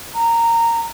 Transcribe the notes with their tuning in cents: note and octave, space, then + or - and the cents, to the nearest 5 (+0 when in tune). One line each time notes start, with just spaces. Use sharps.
A#5 -15